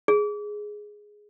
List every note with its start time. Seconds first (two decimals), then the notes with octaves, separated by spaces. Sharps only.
0.08 G#4